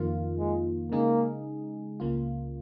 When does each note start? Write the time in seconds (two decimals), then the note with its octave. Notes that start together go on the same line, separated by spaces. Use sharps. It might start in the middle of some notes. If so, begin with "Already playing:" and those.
Already playing: F2 D#3 A#3 F4
0.37 G#3
0.92 C#3 G#3 A#3 D#4 G#4
2.00 C#2 C#3 A#3 F4